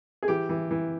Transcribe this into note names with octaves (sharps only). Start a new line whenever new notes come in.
G#4
E3 G4
E3
E3